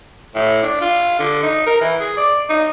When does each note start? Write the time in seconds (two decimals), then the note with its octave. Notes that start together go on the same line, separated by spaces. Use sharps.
0.35 A2
0.63 D4
0.81 F4
1.19 D3
1.43 D#4
1.66 A#4
1.81 E3
2.00 G#4
2.17 D5
2.49 D#4